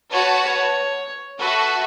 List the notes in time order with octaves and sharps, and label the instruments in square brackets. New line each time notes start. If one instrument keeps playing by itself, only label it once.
[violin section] F#4 B4 F#5 A5 [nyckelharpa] C#5
[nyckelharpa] C#5
[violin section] F#4 A4 E5 [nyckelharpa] B4